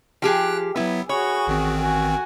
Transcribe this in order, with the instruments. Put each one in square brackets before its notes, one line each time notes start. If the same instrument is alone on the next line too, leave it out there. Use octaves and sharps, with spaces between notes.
[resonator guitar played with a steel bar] F3 G4 G#4 [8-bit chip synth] G5 F#6
[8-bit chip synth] F#3 B3 [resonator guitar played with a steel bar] E4 B4
[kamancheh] F#4 G#4 [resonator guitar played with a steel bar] C#5 [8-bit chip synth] B5 C#6
[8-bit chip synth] A1 D#3 C4
[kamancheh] F#4 G#5